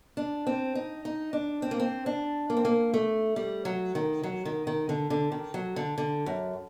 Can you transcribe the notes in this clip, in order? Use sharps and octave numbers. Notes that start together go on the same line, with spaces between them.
D4
C4
D#4
D#4
D4
C4
A#3
C4
D4
A#3
C4
A#3
A3
G3
F#3
D#3
F#3
D#3
D#3
D3
D3
D#3
F#3
D3
D3
F#2